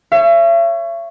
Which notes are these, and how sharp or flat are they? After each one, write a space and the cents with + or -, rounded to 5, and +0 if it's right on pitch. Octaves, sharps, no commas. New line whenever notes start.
C#5 +0 E5 +40